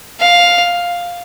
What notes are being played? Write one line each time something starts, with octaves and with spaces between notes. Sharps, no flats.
F5